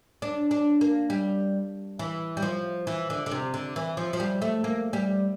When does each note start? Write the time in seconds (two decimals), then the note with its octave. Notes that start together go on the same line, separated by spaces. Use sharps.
0.22 D4
0.51 D4
0.81 A#3
1.10 G3
1.99 E3
2.37 G3
2.42 F3
2.87 E3
3.10 D3
3.26 D3
3.31 C3
3.54 D3
3.76 E3
3.97 F3
4.13 F3
4.20 G3
4.42 A3
4.64 A#3
4.93 G3